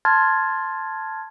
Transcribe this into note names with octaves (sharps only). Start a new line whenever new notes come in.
A5 C6 F6 G#6 A6